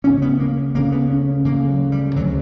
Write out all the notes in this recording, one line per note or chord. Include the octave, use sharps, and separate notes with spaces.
D2 C#3 C#4
B3
A#3
D2 C#3 A#3
B3
C#4
D2 C#3 A#3
F#3
G3
D2 C#3 F#3